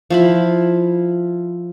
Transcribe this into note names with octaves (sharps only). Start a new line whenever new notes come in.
F3 E4 B5